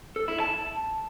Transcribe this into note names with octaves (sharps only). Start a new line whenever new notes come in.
A4
E4
A5